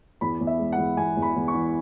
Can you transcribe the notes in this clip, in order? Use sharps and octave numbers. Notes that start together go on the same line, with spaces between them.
E2 B5
E2
E5
G#3
F#5
E2
E2 G#5
E2
B5
E2
C#6
E3